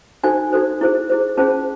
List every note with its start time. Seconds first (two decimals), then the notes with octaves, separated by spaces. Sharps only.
0.23 D#4 F#4 A4 C5 G#5
0.53 D#4 F#4 A4 C5
0.81 E4 G#4 C5
1.10 E4 G#4 C5
1.37 C#4 F4 G#4 C5 A5